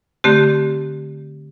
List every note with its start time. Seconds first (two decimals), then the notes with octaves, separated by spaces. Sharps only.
0.24 D3 A3 C4 G4